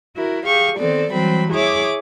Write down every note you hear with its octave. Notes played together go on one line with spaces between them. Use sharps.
E4 F#4 A#4
G4 G#4 F5 C#6
D#3 B3 C4 A4 D5
E3 F#3 G3 C4 B5
E4 G#4 C#5 E5 D6